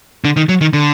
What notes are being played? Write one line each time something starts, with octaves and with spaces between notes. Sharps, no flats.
D3
D#3
F#3
D#3
D3